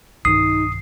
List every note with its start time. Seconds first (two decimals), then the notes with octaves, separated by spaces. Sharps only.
0.25 B1 G2 D#3 D#4 D#6 C7